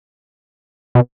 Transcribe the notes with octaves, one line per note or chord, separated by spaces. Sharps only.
B2